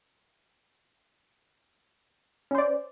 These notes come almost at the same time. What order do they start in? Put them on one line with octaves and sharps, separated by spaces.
C#4 C5 D5